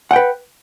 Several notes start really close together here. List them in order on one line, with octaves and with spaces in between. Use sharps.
F#5 G5 B4